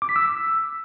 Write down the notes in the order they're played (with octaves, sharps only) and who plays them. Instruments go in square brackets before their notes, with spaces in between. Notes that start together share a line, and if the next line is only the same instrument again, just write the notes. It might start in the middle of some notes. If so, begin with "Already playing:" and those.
[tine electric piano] D6
B6
E6